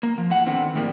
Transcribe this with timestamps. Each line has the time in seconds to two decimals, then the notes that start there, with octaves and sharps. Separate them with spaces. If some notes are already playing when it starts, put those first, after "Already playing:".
0.03 A#3
0.18 F3
0.30 A2 F#5
0.47 D3 D#3 B3 C4
0.75 A2 F3 G3 A#3